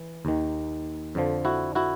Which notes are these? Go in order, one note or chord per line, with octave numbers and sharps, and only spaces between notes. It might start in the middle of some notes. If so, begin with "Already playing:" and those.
Already playing: E3
D#2 D#3
F2 D3 F3
E4 F#4
E4 F#4